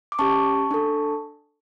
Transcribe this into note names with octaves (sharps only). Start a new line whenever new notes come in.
D6
C#4 G4 A5 C#6
D4 A4